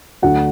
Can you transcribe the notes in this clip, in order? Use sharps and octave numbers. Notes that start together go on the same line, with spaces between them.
D2 D3 F#3 A3 F#5